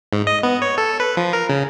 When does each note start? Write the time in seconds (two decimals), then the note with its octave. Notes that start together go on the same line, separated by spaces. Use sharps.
0.13 G#2
0.27 D#5
0.43 B3
0.62 C#5
0.78 A4
1.00 B4
1.17 F3
1.33 A#4
1.49 C#3